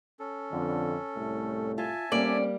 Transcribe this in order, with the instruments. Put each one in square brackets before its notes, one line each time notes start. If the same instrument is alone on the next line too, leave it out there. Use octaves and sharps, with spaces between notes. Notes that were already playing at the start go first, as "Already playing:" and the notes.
[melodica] C#4 A4
[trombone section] F2 D3
C2 A2 A3
[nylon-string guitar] F4 [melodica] E5 G#5 A5
[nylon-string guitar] G3 A#3 [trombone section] A3 C4 C#4 [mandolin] D5